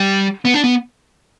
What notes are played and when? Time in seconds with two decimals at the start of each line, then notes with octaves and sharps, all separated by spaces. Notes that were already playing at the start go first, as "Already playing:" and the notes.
Already playing: G3
0.45 B3
0.54 D4
0.64 B3